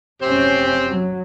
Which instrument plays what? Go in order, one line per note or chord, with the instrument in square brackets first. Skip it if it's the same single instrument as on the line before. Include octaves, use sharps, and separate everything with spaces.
[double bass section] F1 F#2 C#4 [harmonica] C4 G4 C5
[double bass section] F#3